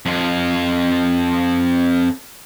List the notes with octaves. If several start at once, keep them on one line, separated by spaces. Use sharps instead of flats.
F2 F4